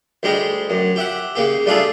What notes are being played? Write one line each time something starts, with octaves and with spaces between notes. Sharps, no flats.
D2 G3 G#3 G4 D#5
F#2
G4 E5 F#5
C#3 A#3 G4
G3 A3 D4 F4 G#4 A4